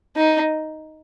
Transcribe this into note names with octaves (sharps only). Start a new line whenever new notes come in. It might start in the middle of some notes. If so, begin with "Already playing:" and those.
D#4